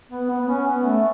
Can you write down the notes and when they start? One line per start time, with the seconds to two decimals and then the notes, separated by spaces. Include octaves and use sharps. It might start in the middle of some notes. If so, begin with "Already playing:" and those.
0.11 B3
0.30 B3
0.40 B3
0.48 C#4
0.67 B3
0.84 A3